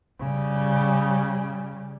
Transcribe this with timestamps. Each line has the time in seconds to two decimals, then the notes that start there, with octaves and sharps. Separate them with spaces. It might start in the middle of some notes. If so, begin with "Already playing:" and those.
0.19 C#3 G3